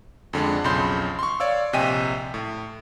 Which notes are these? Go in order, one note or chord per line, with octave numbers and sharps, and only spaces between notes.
F2 D3 G#3 D4
B1 F2 C#3 B5 C6 G6
C6 C#6
C#5 D5 F5 E6
A#1 C3 D#5 G5 G#5 D#7
A2